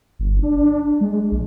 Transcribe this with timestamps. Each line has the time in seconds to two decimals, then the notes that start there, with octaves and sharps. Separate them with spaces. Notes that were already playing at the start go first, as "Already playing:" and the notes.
0.19 G1
0.42 D4
1.01 G#3
1.32 A#1